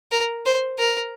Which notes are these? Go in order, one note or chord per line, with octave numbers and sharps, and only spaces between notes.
A#4
C5
A#4